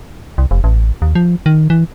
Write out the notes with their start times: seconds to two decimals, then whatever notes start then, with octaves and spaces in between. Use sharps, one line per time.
0.38 C2
0.51 F1
0.64 A1
1.02 D#2
1.15 F3
1.46 D#3
1.70 E3